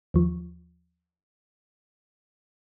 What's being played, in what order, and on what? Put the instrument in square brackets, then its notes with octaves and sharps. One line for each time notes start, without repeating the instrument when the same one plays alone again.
[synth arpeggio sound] D#2 F3